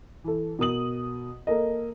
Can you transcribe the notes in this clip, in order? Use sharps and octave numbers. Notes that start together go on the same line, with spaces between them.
E3 A4
B2 A#4 D#6 F#7
A#3 A4 A#4 D#5